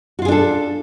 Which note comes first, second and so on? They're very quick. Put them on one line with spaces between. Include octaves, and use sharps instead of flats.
F#4 F4 G#4 D4 A4